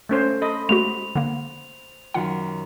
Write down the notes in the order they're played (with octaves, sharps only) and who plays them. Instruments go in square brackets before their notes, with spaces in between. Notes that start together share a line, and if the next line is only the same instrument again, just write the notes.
[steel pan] A3 C#4 C5
[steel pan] A4 D#5 [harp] C5 B5
[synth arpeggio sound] G#3 A3 F#4 [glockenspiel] F7
[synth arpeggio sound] D3 A#3
[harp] F#2 D#3 F4 [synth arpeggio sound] F#5